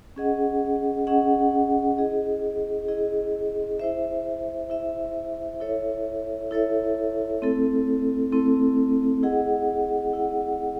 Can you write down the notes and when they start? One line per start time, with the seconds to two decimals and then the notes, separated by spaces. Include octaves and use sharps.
0.16 C#4 G#4 D#5 F#5
1.07 C#4 G#4 D#5 F#5
1.98 E4 G#4 D#5
2.88 E4 G#4 D#5
3.79 E4 C5 E5
4.70 E4 C5 E5
5.60 E4 A4 C#5 E5
6.51 E4 A4 C#5 E5
7.42 A3 C4 E4 A4
8.32 A3 C4 E4 A4
9.23 E4 G#4 D#5 F#5
10.13 E4 G#4 D#5 F#5